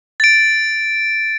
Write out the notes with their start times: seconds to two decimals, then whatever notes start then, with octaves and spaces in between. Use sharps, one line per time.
0.20 A6 D7